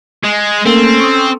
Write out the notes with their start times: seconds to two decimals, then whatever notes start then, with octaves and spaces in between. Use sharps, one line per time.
0.24 G#3
0.66 A3 A#3 C4 C#4 A4
1.00 C#6 D#6